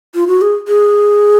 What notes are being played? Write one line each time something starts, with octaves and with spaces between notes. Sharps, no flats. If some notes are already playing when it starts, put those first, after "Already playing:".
F4
F#4
G#4
G#4